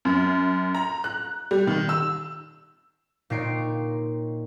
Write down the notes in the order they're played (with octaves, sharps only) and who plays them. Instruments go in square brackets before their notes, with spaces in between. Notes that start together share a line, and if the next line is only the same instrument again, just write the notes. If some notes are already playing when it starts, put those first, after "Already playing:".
[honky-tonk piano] F#2
A#5
F#6
G3
D#3
E6
[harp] A#2 C4 D#4 C#5 C7 D7